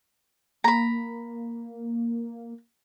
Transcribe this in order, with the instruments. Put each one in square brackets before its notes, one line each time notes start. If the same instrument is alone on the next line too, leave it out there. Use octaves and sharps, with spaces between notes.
[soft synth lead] A#3 [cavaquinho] A#5 B5